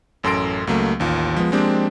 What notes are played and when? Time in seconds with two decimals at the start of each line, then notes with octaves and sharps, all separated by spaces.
0.23 A1 F#2 A4 C6 A#6 D7
0.67 C#2 F#3 A3 A#3
1.00 A1 D#2 F4
1.36 F3 G#3 B3
1.52 F3 G#3 A#3 C4 D4 G4